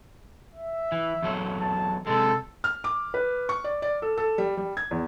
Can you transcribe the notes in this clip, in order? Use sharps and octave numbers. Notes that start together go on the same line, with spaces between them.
E5
E3
E2 F#3 A4
A5
C3 G#3 A4
F6
D6
B4
C#6
D5
D5
A4
A4
G3
G3
G#6
E2